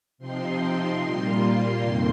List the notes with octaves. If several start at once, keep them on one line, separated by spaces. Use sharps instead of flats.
C3 F3 C4 D#4 C6
A#2 G3 A#3 F4
F2 C3 D#3 A#3 C6